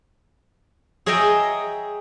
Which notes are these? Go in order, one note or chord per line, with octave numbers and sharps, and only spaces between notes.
G#4 C#5 D#5 E5 G5 A#5